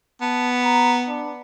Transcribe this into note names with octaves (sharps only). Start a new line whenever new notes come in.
B3 A5
A#5
D4